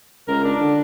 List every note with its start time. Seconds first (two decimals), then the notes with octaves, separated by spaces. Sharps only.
0.28 C#2 A#4
0.44 D4
0.61 D3